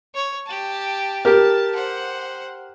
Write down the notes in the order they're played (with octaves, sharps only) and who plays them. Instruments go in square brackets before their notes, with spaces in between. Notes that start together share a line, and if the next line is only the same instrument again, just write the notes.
[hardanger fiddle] C#5
G4 A5
[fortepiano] G4 A#4 [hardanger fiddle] A5
[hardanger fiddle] C5 F#5